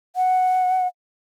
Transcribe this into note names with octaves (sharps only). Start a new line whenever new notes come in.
F#5